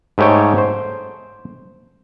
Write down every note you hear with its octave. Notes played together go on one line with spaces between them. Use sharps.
G#2 A3 G4 C#5 G5
C5